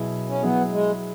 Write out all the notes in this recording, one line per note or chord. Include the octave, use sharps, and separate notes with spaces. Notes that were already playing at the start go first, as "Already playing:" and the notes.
Already playing: B2 F#3 E4 G#4
C#4
F#3 B3 E4 G#4
G#3